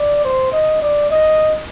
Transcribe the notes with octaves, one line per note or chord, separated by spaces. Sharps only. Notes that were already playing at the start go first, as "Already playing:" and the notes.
Already playing: D5
C5
D#5
D5
D#5